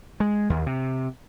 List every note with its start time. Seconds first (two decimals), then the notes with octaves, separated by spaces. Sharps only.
0.20 G#3
0.50 D#2
0.66 C3